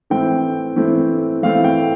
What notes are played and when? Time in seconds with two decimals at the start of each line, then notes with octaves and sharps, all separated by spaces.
0.10 E3 A3 C4 E4 G5
0.76 E3 A3 C4 E4
1.43 E3 A3 C4 E4 F5
1.64 G5